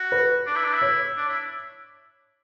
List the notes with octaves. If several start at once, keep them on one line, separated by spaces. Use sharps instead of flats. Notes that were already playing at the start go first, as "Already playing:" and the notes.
Already playing: F#4
B4
D4
E4
D4
E4
C#5
D4
E4